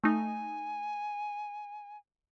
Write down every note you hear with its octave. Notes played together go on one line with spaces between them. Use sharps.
A3 D#4 G#5